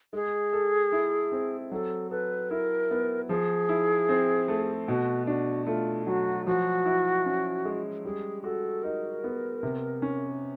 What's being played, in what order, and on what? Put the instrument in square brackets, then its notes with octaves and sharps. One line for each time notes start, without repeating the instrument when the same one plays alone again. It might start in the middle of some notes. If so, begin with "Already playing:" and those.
[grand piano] G#3 [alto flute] G#4
[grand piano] A4
E4
C4
[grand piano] F#3 [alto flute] A4
[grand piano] A4 [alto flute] B4
[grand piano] E4 [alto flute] A#4
[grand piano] B3
[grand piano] F3 [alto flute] G#4
[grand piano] E4
C4
A3
[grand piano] B2 [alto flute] F#4
[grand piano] D4 [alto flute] F#4
[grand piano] A3 [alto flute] F4
[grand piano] F#3 [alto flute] F#4
[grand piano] F3 [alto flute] F#4
[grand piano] E4
C#4
G#3
[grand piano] G3 [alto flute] G#4
[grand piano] F#4 [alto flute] A4
[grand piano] D#4 [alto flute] A#4
[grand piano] B3
C3
C#4